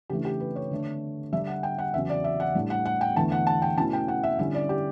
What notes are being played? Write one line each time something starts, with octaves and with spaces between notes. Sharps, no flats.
C#3 E3 A3 D4 G4
G4
B4
C#5
D3 A3 D4
D3 G3 D4 E5
F#5
G5
F#5
E2 C#3 F#3 C#4 E5
D5
E5
F#5
A2 G3 D4
F#5
F#5
G5
E2 D3 A3 E4 A5
F#5
A5
G5
B2 A3 C#4 E4 A5
G5
F#5
E5
D3 G3 C#4 E4 E5
D5
G4